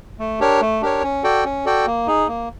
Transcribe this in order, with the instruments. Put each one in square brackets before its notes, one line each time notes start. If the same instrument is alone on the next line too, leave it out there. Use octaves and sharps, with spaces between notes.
[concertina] A3
D4 G4 A#4 C#5
A3
D4 G4 A#4 C#5
C#4
F#4 A4 D5 G5
C#4
F#4 A4 D5 G5
A#3
D#4 G#4
A#3